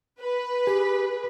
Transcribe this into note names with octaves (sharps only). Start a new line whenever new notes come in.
B4
G4 G#4